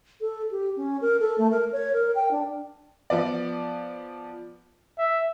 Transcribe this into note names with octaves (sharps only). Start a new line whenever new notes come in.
A4
G4
C#4
A#4
A4
A3
A#4
C#5
A#4
G5
D4
F3 B3 D5
E5